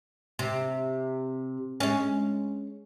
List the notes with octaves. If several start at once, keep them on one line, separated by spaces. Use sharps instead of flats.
C3
G#3 C#4